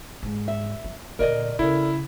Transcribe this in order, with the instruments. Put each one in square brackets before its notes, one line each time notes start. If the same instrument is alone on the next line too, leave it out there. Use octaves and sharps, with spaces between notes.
[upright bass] G#2
[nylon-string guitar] E5
[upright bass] F3
[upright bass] A#2 D3 [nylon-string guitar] A#4 D5 D#5
[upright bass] C#3 [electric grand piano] E4 [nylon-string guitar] A4 A#4